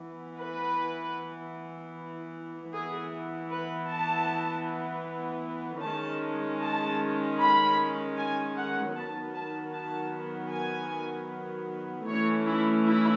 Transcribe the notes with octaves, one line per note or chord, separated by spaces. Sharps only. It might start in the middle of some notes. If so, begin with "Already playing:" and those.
Already playing: E3 B3
B4
E3 B3 G#4
B4
A5
D#3 G#3 C#4 A5
A5
B5
G#5
F#5
D#3 F#3 B3 A5
A5
A5
G#5
E3 A3 C#4 C#5
E4
E4